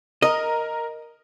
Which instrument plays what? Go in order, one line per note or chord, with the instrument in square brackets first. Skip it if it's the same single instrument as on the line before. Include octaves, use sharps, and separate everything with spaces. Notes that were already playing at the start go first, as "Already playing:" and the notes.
[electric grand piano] A#4 A#5 [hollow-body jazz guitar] D#5